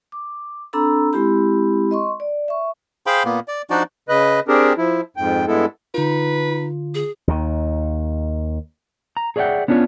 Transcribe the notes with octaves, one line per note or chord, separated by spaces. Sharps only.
D6
C4 D4 A4 A#5 B5 E6
G#3 C4 E4 G4 B5
D#5 C6 C#6
D5
E5 C#6
G#4 C5 F5 G5 B5 C6
A#2 A#3 B3
D5
F3 D4 D#4 F#4 D5
C#3 B4 D#5 F#6
C4 D4 G4 G#4 A#4
F3 E4
F2 G#2 G5
G2 G#3 B3 E4 A4
D3 D#4 F4 B4
G#4
D#2 D#3
A#5
G#4 C#5 D5 E5 F#5 G5
B3 C#4 D4 F4 A#4 C#5